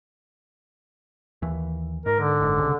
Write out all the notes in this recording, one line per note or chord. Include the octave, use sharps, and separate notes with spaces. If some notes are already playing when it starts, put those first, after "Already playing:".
D#2 E3
G#2 A#4
D3
F#1 G#2
C2 C#3